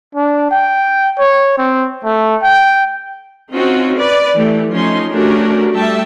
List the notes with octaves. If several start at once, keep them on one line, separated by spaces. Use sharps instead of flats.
D4
G5
C#5
C4
A3
G5
C4 C#4 D#4 F4 F#4
B4 D5
E3 A3 G4
F3 A3 C#4 D#4 C6
A3 C#4 D4 F#4 G4 A#4
G3 A3 E5 G5 A5